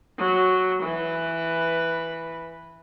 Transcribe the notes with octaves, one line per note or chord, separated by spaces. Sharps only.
F#3
E3 B4